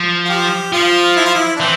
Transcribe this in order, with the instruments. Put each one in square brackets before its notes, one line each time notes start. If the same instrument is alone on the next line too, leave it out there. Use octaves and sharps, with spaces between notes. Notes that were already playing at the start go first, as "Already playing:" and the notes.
Already playing: [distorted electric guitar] F3
[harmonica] F4
G4
[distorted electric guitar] F3 [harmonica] F4
[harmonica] E4
F4
E4
D4
[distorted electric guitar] E3 [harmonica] C4